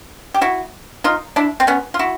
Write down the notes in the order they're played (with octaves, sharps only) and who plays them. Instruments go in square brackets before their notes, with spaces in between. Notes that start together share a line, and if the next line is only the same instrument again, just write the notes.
[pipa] G4
E4 F#4
D#4 F4
D4 E4
C4
B3 C#4
F4
E4 F#4